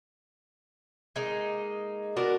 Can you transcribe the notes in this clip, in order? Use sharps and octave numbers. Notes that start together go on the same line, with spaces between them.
G#3 A#3 D#4
B3 D4 F#4 A#4